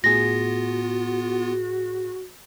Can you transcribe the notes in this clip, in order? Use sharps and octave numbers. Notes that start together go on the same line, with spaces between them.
A2 B3 F4 F#4 G#4 A#6